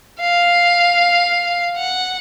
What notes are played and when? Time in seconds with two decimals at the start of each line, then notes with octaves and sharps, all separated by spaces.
0.21 F5
1.77 F#5